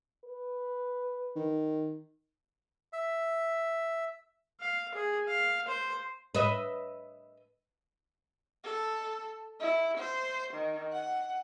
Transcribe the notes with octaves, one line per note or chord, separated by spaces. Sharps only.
B4
D#3
E5
F5
G#4
F5
C5
B4 D#5 E5
A4
E4
C5
D#3
F#5